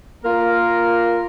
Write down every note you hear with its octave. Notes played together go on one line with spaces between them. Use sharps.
A#3 F4 A#4